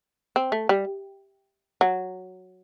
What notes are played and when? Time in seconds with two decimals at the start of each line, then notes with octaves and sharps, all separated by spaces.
0.36 C4
0.52 A3
0.69 G3
1.81 F#3